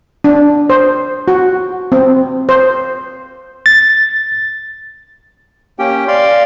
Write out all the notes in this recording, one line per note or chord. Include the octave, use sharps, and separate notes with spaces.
D4
C5
F#4
C4
C5
A6
A#3 C#4 G4 G5
D5 F5 C6